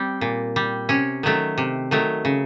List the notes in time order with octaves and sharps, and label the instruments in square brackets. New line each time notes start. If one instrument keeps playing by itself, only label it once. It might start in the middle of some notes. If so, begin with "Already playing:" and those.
Already playing: [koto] G3 C4
A#2
G3
C3 C#4
D#3 F#3 A3
C3
D#3 F#3 A3
C#3